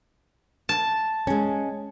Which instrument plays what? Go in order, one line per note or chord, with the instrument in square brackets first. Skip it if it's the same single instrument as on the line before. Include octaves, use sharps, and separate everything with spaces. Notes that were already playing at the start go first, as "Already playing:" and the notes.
[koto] A5
[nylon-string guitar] G#3 C#4